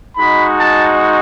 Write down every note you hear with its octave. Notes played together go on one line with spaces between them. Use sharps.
G#3 D#4 F#4 B5
A5